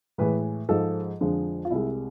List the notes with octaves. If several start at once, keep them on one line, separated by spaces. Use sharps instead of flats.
A2 E3 G#3 B4
G#2 F3 G#3 A4
F2 D3 F3 G#3
F4
C2 C3 G#3 E4